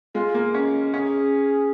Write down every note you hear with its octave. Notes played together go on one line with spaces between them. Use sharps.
G#3 F4
A#3
C#4
C#4 G#4